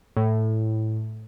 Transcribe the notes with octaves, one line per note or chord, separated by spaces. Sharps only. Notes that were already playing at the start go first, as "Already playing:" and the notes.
A2